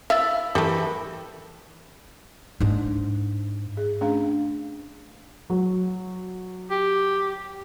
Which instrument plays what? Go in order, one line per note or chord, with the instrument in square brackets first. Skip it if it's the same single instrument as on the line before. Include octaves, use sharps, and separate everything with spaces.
[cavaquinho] E4 [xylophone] E5 E6 A6 [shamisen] F5
[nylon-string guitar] E3 A#4 [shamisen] G3 A3
[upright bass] G#2 D4
[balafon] G#4
A3 C#4 D4 G#4 F5 A#5
[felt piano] F#3
[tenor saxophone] G4